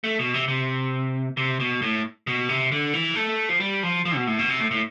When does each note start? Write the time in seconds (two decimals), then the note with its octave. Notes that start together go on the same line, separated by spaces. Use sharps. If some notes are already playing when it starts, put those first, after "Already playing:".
0.04 A3
0.19 B2
0.34 C3
0.48 C3
1.37 C3
1.60 B2
1.82 A2
2.27 B2
2.49 C3
2.72 D3
2.94 E3
3.15 A3
3.49 F3
3.60 G3
3.83 F3
4.05 F3
4.16 B2
4.27 A2
4.39 B2
4.49 C3
4.60 A2
4.71 A2